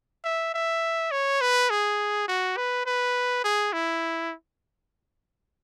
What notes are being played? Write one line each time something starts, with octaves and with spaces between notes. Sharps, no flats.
E5
E5
C#5
B4
G#4
F#4
B4
B4
G#4
E4